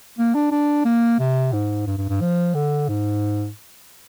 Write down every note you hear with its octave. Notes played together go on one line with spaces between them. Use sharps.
A#3
D4
D4
A#3
C3
G#2
G2
G2
G2
F3
D3
G#2